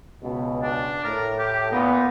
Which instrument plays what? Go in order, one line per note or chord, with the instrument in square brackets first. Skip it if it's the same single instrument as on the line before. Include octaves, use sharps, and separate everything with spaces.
[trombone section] C#2 B2
[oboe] D4
[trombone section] A2 [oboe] A#4
[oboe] G4
[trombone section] A#2 B3 [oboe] D#4